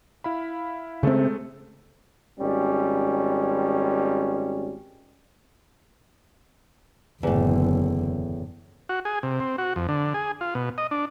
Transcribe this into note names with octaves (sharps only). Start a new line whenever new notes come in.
E4 F5 B5
C#3 G#3 A3 C4 A4
G#1 G3 C#4
F#1 E2 A2 D3
F#4
G#4
C3
C4
F#4
F2
D3
G#4
F4
B2
D#5
D4